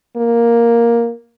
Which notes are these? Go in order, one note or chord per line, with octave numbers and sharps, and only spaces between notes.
A#3